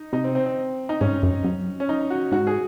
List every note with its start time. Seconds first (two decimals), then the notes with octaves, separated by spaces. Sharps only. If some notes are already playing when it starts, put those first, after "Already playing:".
Already playing: D#4
0.13 C3 D#4
0.24 C4
0.35 C4
0.46 C4
0.89 D#4
1.01 G#2 C#4
1.23 F#2
1.44 F#2
1.80 C#4
1.89 D#4
2.10 F#4
2.32 G#2 F#4
2.47 G#4